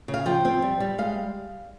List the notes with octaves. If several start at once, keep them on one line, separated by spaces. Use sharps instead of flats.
C#3
F5
F3 G5
C4
G3
G3
G#3 F5